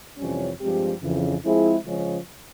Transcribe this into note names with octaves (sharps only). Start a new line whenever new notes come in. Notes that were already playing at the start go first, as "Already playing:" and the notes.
F2 C3 E3 G3 C#4
G2 F3 G#3 C4 G4
F2 C#3 E3
F3 G#3 C4 E4 G#4
C#3 F3 G#3 C#4